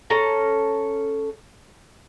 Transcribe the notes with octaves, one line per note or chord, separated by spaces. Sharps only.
C#4 A4 A#5